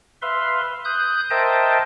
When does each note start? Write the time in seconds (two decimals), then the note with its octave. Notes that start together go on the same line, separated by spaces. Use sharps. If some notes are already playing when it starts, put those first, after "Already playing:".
0.22 B4 E5 F5 C6
0.85 D#6 F#6 G6
1.30 A#4 C5 D#5 E5 G5 A5